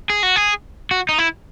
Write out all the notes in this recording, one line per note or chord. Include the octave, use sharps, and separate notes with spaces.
G#4
F#4
G#4
F#4
D#4
E4